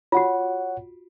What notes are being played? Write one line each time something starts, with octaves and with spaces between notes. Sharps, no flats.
F4 F#4 C#5 F#5